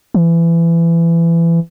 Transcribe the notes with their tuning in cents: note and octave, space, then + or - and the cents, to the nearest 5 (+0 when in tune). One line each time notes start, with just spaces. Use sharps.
E3 +25